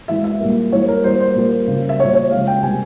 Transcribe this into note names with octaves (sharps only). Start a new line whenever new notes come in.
E3 G#3 E5
E5
A#2 G3 A#3
E3 G3 A#3 C#5
A#4
E3 G3 A#3 C5
C5
A#2 G3 A#3
C#3 G3 A#3
E5
A#2 G3 A#3 C#5
C#5
C#3 F3 G#3 F5
G5
C3 G3 A#3 G#5